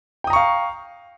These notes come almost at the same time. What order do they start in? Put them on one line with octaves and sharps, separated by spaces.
G5 D#6 A#5 C#6 F5